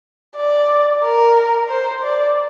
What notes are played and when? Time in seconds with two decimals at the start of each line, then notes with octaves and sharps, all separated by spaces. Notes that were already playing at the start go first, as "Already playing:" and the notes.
0.36 D5
1.03 A#4
1.69 C5
2.02 D5